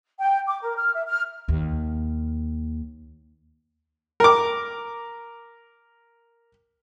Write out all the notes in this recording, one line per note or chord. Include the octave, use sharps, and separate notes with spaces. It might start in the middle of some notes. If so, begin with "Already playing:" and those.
G5
D6
A#4
F6
E5
F6
D#2
A#4 D6